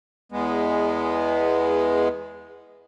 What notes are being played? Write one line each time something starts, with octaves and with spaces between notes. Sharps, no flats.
E2 G#3 B3